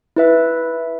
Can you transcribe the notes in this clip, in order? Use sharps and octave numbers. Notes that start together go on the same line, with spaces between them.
E4 B4 E5